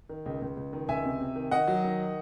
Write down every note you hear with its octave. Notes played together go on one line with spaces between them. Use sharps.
D#3
C#2
C#2
C#2
D#3
C#2 E5 G#5
C3
C3
D#3
D#3 D#5 F#5
F#3
D#3